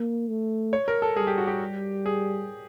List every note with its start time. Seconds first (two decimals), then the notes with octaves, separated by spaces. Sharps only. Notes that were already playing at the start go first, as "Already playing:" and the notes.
Already playing: A#3
0.28 A3
0.73 C#5
0.88 A#4
1.02 A4
1.16 G3 G#4
1.27 G4
1.38 F#4
1.47 G4
2.06 G#4